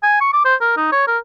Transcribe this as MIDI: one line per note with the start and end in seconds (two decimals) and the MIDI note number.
0.03 0.20 80
0.21 0.30 85
0.33 0.43 86
0.45 0.55 72
0.61 0.72 70
0.77 0.89 63
0.92 1.06 73
1.07 1.18 70